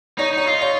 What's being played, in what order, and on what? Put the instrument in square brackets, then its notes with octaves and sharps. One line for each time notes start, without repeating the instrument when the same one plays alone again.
[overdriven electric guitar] D#4 [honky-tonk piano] C#5
[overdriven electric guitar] D#4 [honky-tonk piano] C#5
[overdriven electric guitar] F4 [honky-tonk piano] D#5
[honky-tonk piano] C#5